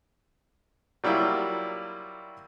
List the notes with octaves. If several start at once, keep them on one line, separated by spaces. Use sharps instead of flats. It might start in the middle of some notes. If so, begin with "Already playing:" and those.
F#3 G3 A#3 E4 F4